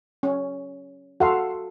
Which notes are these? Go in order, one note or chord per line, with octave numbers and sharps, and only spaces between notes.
C#4
F#4 A4 F5 F#5 C6